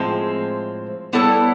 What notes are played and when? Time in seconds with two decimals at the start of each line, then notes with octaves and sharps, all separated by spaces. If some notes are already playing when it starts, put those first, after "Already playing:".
Already playing: A2 F3 G#3 C4
1.13 G3 B3 E4 A4 C#5